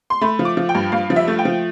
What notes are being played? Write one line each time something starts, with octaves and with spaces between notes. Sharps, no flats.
C6
A3 B5
F3
D6
F3
G5
G2
G2 F5
F3
E5
A3
G5
F3